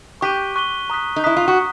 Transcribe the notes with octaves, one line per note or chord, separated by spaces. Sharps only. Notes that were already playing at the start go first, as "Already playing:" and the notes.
G4 C#6 F#6 B6 D#7 G7
C#6 F#6 B6 D#7 G7
A#5 D#6 F#6 B6
D#4
E4 A#5 D#6 F#6 B6
F4
F#4